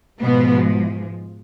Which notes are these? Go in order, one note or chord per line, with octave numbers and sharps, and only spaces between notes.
G#2 B2 F3 G#3 B3